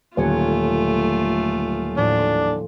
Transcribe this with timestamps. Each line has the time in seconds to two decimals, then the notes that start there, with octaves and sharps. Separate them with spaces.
0.17 D#1 D3 F#3 A3 C#4 F4
1.97 A2 F3 D4